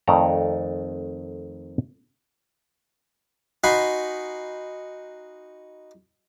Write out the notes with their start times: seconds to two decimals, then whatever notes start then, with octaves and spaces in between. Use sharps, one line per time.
0.07 F2 D#3 A3 A4 D5 A#5
3.64 D#4 F#4 F#5 G#5 B5 C6